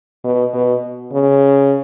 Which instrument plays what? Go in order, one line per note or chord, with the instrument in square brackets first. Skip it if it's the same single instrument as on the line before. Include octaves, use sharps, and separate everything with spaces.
[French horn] B2
B2
C#3